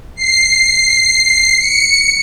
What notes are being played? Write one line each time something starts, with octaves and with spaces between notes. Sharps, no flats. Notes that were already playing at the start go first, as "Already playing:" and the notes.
C7
C#7